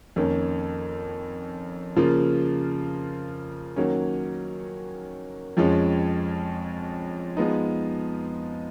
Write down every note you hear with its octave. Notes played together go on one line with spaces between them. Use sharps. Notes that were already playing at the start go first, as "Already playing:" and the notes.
F2 D#3 A#3 C#4
C#3 F3 A#3 F4
D#3 F#3 A#3 C#4
F2 F3 G#3 C#4
F3 G#3 B3 D#4